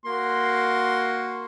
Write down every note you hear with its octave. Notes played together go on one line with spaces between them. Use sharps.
A#3 F#4 C6